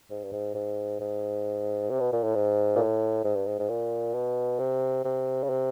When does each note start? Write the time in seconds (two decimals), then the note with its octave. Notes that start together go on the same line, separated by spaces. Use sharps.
0.11 G#2
0.24 G2
0.32 G#2
0.55 G#2
1.00 G#2
1.90 C3
2.00 B2
2.13 A#2
2.23 A2
2.35 G#2
2.76 A#2
2.79 A2
3.24 G#2
3.36 G2
3.47 G#2
3.59 G#2
3.69 A#2
4.14 B2
4.59 C3
5.04 C3
5.43 C#3
5.50 C3